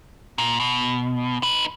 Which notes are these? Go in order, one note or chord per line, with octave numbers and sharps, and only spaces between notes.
A#2
B2
D#4 B4